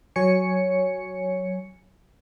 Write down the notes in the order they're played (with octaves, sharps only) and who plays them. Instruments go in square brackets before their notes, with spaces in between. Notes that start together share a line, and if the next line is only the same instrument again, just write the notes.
[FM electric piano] F#3 C#5 G#5 C#7